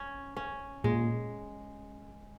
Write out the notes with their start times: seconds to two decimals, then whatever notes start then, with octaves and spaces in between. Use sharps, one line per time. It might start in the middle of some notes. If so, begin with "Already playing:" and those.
Already playing: C#4
0.37 C#4
0.84 A#2 G#3